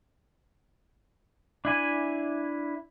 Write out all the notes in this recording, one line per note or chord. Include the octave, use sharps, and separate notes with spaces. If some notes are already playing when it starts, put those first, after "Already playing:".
D4 E4 G#5